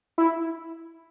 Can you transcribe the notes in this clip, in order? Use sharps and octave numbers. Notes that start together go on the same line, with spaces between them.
E4